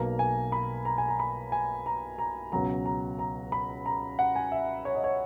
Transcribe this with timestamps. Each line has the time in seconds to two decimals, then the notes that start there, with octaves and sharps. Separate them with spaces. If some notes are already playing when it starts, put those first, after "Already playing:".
Already playing: B1 B2 A#3 A#5
0.19 G#5
0.52 B5
0.85 A#5
0.98 G#5
1.08 A#5
1.19 B5
1.52 G#5
1.86 A#5
2.19 A#5
2.52 C#2 B2 F#3 A#5
2.86 A#5
3.19 A#5
3.52 B5
3.86 A#5
4.19 F#5
4.36 G#5
4.52 E5
4.85 C#5
4.95 D#5
5.04 C#5